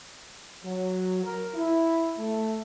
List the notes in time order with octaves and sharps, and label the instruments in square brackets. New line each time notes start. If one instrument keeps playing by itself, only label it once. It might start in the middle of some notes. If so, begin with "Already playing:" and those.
[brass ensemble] F#3
A#4
E4
A3